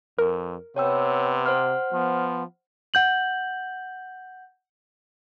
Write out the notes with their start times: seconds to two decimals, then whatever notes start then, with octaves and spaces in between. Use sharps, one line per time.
0.19 F2 A#4
0.76 C3 B3 C#5 G5 E6
1.46 C5 F#5 F6
1.93 F3 B3
2.94 F#5 G6 F#7